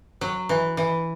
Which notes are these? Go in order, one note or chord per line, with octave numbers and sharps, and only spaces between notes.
F#3
E3
E3